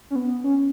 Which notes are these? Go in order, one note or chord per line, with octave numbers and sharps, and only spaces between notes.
C#4
B3
C#4